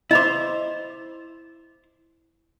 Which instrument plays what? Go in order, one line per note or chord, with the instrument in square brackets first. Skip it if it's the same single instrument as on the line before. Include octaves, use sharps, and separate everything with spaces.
[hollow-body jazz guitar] E4 C5 [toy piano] D#5 B5 D6